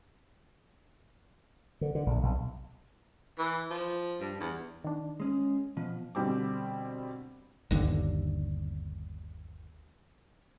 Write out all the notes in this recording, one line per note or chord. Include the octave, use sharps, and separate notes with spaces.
D3
D3
A#1
B1
E3
F3
G2
E2
D#3 D4
G#3 C#4
B2 F3
B2 D3 G3 C4 D6
G1 D#2 D3